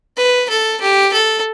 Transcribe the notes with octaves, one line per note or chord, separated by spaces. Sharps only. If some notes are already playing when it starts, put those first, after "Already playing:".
B4
A4
G4
A4